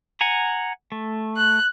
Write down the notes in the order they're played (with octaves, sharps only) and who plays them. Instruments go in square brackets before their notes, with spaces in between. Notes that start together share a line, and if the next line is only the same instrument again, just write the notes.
[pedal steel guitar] F#5 G#5 A#5
A3
[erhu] F#6